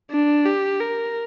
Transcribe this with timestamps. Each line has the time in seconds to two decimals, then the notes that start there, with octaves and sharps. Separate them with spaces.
0.11 D4
0.46 G4
0.80 A#4